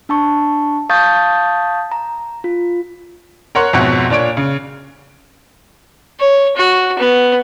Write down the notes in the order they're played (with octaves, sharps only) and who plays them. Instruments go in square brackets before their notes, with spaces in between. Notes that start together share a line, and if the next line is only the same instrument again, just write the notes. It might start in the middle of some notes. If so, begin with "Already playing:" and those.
[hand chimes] D4 A5 C#6
F5 A5 C#6 D#6 G6 A6
A#5
F4
[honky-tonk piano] A#4 C#5 F#5 C6 F#6
F2 G#2 B2 C#5 E5 F#5
A#2 D4 C#5 D7
C#3
[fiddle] C#5
F#4
B3